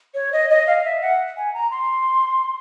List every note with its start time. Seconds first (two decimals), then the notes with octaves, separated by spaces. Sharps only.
0.14 C#5
0.32 D#5
0.50 D#5
0.67 F5
0.85 E5
1.02 F#5
1.37 G#5
1.54 A#5
1.71 C6